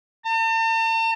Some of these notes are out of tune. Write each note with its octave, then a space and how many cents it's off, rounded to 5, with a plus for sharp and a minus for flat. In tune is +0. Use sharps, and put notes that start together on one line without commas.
A5 +45